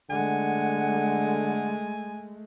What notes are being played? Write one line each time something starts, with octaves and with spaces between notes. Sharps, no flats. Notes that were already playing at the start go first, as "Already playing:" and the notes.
D3 G#3 A3 F#5 G#5